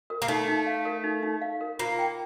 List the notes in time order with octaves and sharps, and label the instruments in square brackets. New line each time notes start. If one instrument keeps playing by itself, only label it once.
[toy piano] A#4
[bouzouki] A#3
[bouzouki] A3 [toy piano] D#4
[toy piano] D#4
F5
A#4
D#4
D#4
F5
A#4
[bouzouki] A#3 [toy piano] F4
[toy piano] G5